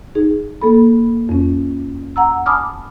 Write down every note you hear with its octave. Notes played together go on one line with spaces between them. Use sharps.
D#4 G#4
A#3 A4 B5
F2 C#4
F#5 A#5 E6
G#5 A5 B5 D6 D#6 F6